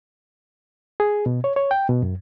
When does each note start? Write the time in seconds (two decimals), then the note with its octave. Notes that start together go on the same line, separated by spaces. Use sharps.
1.00 G#4
1.26 B2
1.44 C#5
1.56 C#5
1.71 G5
1.89 B2
2.03 F#2